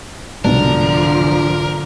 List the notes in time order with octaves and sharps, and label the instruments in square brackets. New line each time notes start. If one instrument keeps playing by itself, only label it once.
[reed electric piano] C2 G#2 B2 [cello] D3 F3 [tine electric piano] D4 [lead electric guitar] A#4